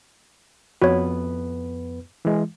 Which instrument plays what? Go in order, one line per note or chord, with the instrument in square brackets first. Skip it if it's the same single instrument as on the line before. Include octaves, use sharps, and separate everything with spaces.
[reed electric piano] F2 B3 B4 [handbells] F#4 C#5
[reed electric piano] E3 G#3